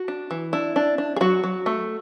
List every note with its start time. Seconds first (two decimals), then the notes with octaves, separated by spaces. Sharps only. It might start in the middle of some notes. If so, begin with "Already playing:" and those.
Already playing: F#4
0.08 D4
0.31 E3
0.53 D4 E4
0.76 D4
0.98 D4
1.16 G#4
1.21 F#3 F#4
1.44 F#3
1.66 A3